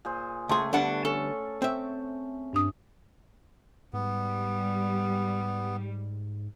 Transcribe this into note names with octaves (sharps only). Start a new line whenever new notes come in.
A#2 G#4 C5
C#2 A3 G#4 A5 C6
D3 G3 B3 D4 F#5
C#4 A4
C4 E5
G2 D4 D#6
G#2 G3 B3